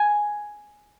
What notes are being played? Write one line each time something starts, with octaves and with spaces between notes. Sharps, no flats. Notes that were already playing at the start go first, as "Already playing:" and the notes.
Already playing: G#5